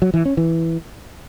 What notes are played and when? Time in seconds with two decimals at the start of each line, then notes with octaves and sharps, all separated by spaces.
0.02 F#3
0.14 E3
0.25 C#4
0.37 E3